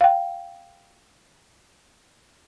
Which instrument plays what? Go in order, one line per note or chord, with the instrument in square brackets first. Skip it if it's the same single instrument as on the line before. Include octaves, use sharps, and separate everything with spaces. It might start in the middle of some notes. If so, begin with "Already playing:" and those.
[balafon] F5 G5